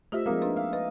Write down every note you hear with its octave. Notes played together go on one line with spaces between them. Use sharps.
A3 F4 G4 C5 D#5 E5
F3 G#3 A#3 C4 D#4
D4 B4
E5 F5
B4 D#5